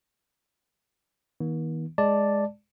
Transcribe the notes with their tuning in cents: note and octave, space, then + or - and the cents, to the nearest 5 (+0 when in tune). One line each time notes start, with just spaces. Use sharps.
D#3 +40 A#3 +45
G#3 +0 D5 +0 A5 +0